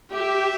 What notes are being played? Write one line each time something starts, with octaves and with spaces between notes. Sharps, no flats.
G4 E5